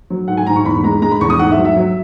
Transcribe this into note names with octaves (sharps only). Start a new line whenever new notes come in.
F#3
G#2 F#5
G#5
G#2 A#5
C#6
E2 B5
G#3 A#5
G#3 A#5
B5
E2 C#6
D#6
G#2 F#5
E5
F#3
E5
F#3